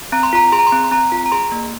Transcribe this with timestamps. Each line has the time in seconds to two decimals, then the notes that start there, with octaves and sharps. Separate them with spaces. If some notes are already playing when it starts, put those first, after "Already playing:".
0.12 C4 A#5
0.23 C6
0.33 F4 A#5
0.52 G#4 C6
0.59 A#5
0.67 C6
0.72 C4
0.84 C6
0.91 C4 A#5
1.12 F4
1.26 A#5
1.32 G#4 C6
1.52 A#3